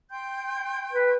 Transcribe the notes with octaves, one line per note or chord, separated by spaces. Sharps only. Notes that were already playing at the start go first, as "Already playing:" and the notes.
G5 C6 G6
B4